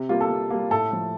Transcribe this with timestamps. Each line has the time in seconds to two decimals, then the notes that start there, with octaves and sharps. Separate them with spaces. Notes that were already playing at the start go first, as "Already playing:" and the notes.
Already playing: C3
0.09 G3 A#3 F4
0.21 A4
0.30 C3
0.50 G3 A#3
0.71 A2 A4
0.91 F3 A3